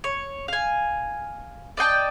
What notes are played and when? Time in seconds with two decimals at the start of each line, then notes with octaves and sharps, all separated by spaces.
0.04 C#5
0.48 F5 G#5
1.77 D5 D#5 G5 A5